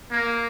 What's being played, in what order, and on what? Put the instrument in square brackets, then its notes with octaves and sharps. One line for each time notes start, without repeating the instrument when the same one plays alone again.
[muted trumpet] A#3